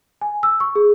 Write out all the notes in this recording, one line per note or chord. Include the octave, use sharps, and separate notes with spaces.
G#5
E6
C#6
G#4